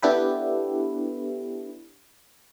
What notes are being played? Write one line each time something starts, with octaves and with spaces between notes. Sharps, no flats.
B3 D4 E4 G4 A4 B4